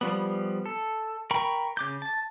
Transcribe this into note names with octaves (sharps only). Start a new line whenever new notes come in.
F3 G3 B3
A4
A#4 G5 A#5 B5 C#6
C#3 D6 G6
A5